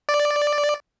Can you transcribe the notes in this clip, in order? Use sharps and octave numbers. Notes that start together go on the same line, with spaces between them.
D5